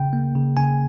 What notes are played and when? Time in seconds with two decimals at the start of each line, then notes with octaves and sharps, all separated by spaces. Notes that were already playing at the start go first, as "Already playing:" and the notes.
Already playing: C#3 G5
0.13 A#3
0.35 C#3
0.57 C#3 G#5